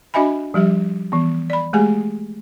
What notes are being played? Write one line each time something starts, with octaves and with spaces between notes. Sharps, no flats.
D4 F#4 D#5 E5 G#5 B5
F3 G3 G4 E5
E3 B3
D5 B5
G#3 A3 G4 G#4 G#5